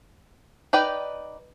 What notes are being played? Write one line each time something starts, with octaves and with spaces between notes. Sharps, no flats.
D#4 B4 D5 G5